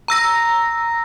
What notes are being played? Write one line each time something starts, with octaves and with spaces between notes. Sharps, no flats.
A#5 E6 A#6